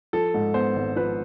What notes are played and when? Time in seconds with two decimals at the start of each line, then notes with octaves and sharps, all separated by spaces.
0.13 F3 A4
0.34 G#2
0.54 B3 C5
0.76 G#1
0.96 F3 B4